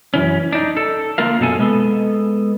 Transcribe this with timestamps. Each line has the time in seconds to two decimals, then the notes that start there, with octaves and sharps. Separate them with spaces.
0.14 F#2 E3 C#4
0.53 D4 D#4
0.77 A4
1.18 D3 A3 A#3 F4 A#4 F5
1.39 F#2 B2 A4 G#5
1.59 G#3 B3 A4